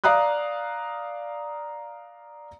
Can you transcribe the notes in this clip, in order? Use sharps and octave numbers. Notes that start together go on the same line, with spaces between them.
D5 F5 A#5 D#6 F#6